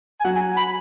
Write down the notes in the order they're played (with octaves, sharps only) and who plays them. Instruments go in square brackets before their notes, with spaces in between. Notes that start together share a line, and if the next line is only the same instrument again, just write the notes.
[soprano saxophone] G#5
[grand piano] F#3 F#4 [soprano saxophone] F#5
[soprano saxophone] G#5
B5